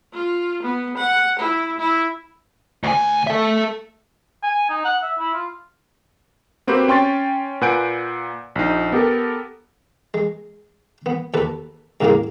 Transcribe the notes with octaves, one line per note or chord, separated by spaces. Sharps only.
F4
B3
F#5
E4
E4
D2 G#5
A4 E5
G#5
D#4
F#5
E5
E4
F4
A#3 C4 F#4 G4 B4 C5
C#4 G5 C6 C#6 A6
A#2 B4 F#5 G#5 G6 D7
A#1 D#4
B3 G4 A4 A#4
G#3
B3
D#2 A4 B4
D#2 A2 C#3 G#3 A#3